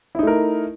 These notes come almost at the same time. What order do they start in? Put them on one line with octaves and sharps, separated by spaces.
E4 D#4 A3 A#4